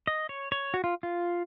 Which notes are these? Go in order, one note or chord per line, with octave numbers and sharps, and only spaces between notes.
D#5
C#5
C#5
F#4
F4
F4